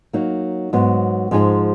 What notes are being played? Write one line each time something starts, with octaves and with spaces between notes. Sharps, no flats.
F#3 A#3 D#4
G#2 F#3 B3
G#2 F3 G#3 D#4 G#4